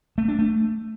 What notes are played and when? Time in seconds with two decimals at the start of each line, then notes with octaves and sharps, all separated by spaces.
0.18 A3
0.28 D4
0.39 A3